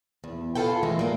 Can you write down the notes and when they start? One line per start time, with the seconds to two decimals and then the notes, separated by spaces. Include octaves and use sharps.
0.24 E2
0.55 F4 G#4 A4 B4 G5
0.83 F#2 E3 G#3 A3 E5
0.99 A#2 A#3